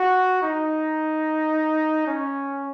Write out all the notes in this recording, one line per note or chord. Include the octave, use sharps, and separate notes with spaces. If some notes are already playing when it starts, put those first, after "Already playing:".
Already playing: F#4
D#4
C#4